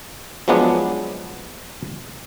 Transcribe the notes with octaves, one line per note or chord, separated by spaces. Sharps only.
F3 F#3 G#3 B3 D4